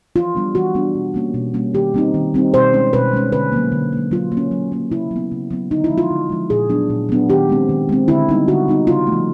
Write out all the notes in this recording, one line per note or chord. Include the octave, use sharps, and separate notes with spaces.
E3 F4
G3 B3 D4
E3 F#4
G3 B3 D4
B2
G3 A#3 C#4
B2
G3 A#3 C#4
D#3 G4
G3 C4 D#4
D#3
G3 C4 D#4
B2 C5
G#3 C#4
B2 B4
G#3 C#4
D3 B4
F#3 A#3
D3
F#3 A#3
F#3 F4
A#3
C#4
F#3
A#3 C#4
C#3 E4
F#3
B3
C#3
F#3 B3
D3 D#4
E4
F3 G#3
F4
D3
F3 G#3
A#2 G#4
F#3 B3 D4
A#2
F#3 B3 D4
D#3 G4
G#3 C4
D#3
G#3 C4
D3 E4
G3 B3 D#4
D3 F#4
G3 B3 D#4
C#3 F4
A3
F3